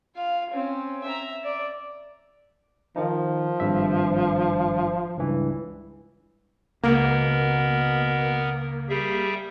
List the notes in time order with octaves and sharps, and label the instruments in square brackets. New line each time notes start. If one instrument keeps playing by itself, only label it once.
[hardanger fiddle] F4 F5
C4 C#4
E5 A#5
D5
[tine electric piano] D#3 D#4 [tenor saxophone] F3
[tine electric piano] G#1 G2 E5
C#2 G2 E3
[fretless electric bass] C#2 [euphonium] B2 [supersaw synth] A#3 [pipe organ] B3 A#4
[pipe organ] G3 G#4 E5 [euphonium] G4